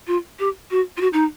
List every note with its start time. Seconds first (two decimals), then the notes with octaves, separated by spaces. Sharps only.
0.07 F4
0.39 G4
0.71 F#4
0.97 F4
1.01 F#4
1.13 D#4